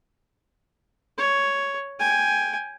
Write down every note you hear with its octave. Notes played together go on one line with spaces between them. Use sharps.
C#5
G5 G#5